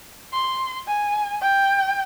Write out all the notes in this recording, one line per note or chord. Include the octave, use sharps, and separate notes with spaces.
C6
G#5
G5